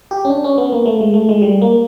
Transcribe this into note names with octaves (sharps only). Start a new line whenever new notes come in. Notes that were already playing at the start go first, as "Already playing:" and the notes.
G4
C#4
D4
C#4
B3
A#3
A3
G#3
A3
G#3
G3
A#3